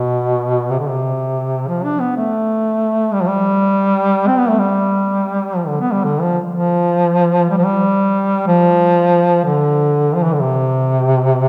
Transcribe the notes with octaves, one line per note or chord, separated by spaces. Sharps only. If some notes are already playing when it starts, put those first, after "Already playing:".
Already playing: B2
C3
D3
C3
F3
D4
B3
A3
G3
F3
G3
C4
B3
A3
G3
F3
D3
B3
G3
D3
F3
F3
G3
F3
G3
F3
D3
F3
E3
D3
C3